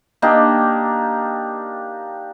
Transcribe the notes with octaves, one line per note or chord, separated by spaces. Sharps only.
A#3 D4 D#4 G4